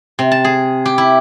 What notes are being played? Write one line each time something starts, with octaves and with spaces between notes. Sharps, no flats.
C3
A5
G#4
G4
E4